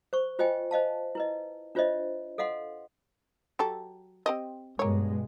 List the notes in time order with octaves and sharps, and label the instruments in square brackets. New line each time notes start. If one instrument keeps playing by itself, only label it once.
[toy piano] C5 C#6
F4 C5 D#5 G5 G#5
C5 D#5 F5 A5
E4 B4 D#5
D4 F4 C5 C#5 D#5 E5
A4 D#5 F5 F#5 C6
[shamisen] F#3 G4 A4
C4 G4 D#5
[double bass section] G2 B2 G#3 [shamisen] A#3 C#5